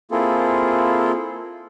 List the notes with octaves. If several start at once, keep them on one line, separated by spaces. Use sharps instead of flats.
A#3 C4 E4 F4 G#4 A4